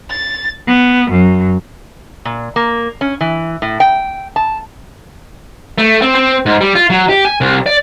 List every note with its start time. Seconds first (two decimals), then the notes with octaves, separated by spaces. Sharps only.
0.11 A6
0.67 B3
1.10 F#2
2.25 A#2
2.56 A#3
3.01 C#4
3.21 E3
3.62 A2
3.80 G5
4.36 A5
5.78 A3
6.02 C4
6.15 C4
6.46 G#2
6.61 G3
6.75 F4
6.90 F#3
7.09 G4
7.25 G#5
7.41 C2
7.66 D5